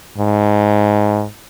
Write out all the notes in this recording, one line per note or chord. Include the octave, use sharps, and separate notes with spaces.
G#2